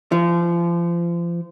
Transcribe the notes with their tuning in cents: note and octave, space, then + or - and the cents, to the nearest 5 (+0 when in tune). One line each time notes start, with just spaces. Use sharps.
F3 -30